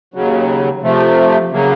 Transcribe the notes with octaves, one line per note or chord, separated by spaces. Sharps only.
D#2 C#3 F#3
C3 F3 A3
C#3 F#3 A#3